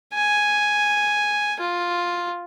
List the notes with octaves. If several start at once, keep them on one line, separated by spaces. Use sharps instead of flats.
G#5
F4